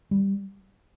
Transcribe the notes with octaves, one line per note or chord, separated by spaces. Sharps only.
G3